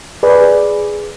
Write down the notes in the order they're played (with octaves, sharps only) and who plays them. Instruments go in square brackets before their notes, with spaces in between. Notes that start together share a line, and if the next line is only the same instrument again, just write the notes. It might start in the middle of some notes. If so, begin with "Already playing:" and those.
[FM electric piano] G#4 B4 D5